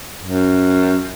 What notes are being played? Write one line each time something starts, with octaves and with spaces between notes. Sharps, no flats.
F#2